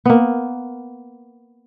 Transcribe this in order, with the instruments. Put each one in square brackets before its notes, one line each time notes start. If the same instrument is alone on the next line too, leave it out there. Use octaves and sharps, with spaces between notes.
[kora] A#3 B3